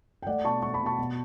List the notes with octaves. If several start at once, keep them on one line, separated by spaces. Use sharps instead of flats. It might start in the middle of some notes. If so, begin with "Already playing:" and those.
G5
A3 D5 F#5
B2 A5 C#6
A3 C#6
B5
B2
A5 C#6
B2